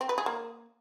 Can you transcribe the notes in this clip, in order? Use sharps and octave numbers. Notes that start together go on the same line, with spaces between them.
C4
B4
G#4
A#3